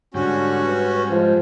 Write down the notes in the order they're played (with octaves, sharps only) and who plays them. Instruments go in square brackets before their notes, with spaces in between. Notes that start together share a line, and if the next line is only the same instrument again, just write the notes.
[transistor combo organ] G#2 G3 [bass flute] D3 [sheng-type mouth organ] C#4 F#4
[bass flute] B4
[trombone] F3 [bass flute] G#3